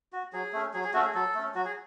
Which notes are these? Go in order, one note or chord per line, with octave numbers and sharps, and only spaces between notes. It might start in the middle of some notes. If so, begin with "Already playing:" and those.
F#4
F#3 G#4
A3 C#4
F#3 G#4
G#4
A3 C#4 F#4
G#4
F#3 A4
A3 C#4
F#3 F#4
G#4